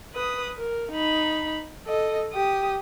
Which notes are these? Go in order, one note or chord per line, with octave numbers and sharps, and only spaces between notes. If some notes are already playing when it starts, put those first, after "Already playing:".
B4 D#6
A#4
D#4 B5
A4 D#5
G4 D#6